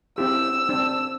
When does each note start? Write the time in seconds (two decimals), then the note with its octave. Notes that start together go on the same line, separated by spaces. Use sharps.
0.18 C4 E4 G4 E6
0.69 C4 D4